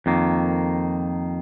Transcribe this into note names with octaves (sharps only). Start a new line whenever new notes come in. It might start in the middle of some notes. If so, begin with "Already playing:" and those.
F2 D#3 A#3